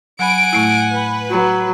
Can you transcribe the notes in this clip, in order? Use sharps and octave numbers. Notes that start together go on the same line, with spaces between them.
F#3 F#5 G#5 B5 D7
A2 A3 E4
B4
F#3